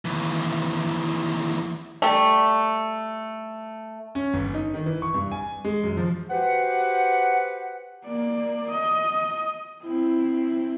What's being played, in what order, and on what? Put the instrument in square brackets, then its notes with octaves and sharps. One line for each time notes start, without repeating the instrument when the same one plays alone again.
[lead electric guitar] D#2 E3
[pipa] G3 A3
[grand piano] C#4
G1
D#4
D#3
E3
C#6
G2
G#5
G#3
F#2
F3
[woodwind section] F#4 G4 B4 C5 F#5
[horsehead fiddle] A#3 D5
D#5
C4 E4